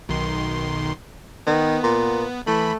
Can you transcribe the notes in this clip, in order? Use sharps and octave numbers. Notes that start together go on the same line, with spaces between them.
B1 D#3 C6
D#3 B3
A#2
E3 A3 B5